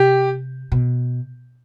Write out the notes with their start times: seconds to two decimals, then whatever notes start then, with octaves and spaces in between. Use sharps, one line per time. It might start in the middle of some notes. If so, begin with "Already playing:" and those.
Already playing: C3 G4
0.72 B2